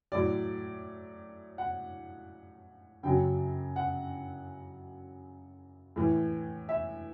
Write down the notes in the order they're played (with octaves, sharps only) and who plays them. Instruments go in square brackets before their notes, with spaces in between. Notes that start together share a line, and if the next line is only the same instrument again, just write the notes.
[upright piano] A2 F#3 D5
F#5
F#2 C#3 F#3 G5
F#5
A2 E3
E5